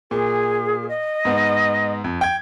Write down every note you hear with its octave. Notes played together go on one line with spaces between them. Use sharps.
A#2 G#4
D#5
G#2 B3
F2
G5 G#6